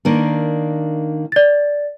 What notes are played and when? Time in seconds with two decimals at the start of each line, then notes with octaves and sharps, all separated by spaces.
0.05 D#3 A#3 D4
1.32 D5 A6